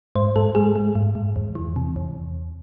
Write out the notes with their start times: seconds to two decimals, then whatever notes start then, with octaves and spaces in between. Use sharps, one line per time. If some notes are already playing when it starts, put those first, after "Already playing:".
0.15 G#2 C5
0.36 G#2 A4
0.55 G#3 G#4
0.76 G#3
0.95 G#2
1.15 G#2
1.36 E2
1.55 E3
1.76 C3
1.96 E2